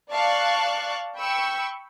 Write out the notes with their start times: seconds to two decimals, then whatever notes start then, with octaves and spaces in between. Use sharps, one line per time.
0.10 D5 F5 A5 C#6 F#6
1.18 G5 B5 C#6 E6